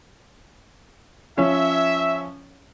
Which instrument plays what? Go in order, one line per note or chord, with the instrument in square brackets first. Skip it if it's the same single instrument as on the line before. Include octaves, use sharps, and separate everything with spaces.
[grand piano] F3 C#4 C#5 [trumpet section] E5